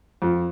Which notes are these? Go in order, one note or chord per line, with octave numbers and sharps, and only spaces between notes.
F2